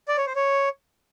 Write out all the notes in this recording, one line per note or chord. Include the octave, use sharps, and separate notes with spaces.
D5
C#5
C5
C#5